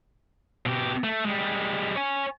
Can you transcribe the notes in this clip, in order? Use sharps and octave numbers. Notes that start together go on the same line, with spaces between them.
B2 G4
A3
G3 G#3
C#5 G#5